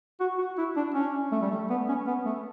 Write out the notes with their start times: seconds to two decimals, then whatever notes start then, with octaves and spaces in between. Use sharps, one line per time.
0.20 F#4
0.38 F#4
0.58 E4
0.77 D4
0.95 C#4
1.32 A3
1.42 G3
1.51 A3
1.70 B3
1.89 C#4
2.07 B3
2.26 A3